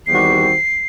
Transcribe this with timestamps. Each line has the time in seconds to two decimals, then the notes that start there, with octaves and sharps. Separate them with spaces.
0.07 E2 D#3 G3 C4 F#4 C7